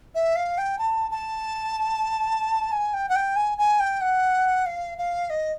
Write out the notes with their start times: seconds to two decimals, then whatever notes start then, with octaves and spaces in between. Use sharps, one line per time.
0.15 E5
0.36 F5
0.58 G5
0.79 A5
1.11 A5
2.72 G#5
2.94 G5
3.09 F#5
3.16 G5
3.36 G#5
3.58 G#5
3.80 G5
4.01 F#5
4.66 F5
4.98 F5
5.30 D#5